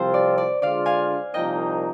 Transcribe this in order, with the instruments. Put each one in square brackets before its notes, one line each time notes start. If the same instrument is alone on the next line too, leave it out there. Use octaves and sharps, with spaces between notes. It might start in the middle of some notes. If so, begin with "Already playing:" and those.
Already playing: [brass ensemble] C2 C3 F3 C4 F4 [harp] C5
[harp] D5
D5
[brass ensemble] D3 G#3 D4 F4 [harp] D5 F5
[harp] F5 G#5
[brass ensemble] C2 A#2 F3 A#3 D#4 [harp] D#5 G5